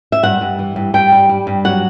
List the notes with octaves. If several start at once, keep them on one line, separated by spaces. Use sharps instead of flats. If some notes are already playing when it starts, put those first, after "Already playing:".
E5
G2 F#5
G2
E3
G2
G2 G5
G3
G3
G2
F#3 F#5